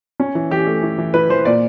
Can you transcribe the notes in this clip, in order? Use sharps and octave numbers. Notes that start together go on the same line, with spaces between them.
C#4
E3
E3 G4
A3
E3
E3
E3 B4
E3 C5
A#2 D5